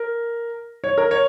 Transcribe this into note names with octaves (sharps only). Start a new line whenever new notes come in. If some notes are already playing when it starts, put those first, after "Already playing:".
Already playing: A#4
C#5
A#4
C#5